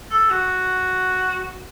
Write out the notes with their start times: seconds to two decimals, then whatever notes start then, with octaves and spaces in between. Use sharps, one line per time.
0.11 A4
0.30 F#4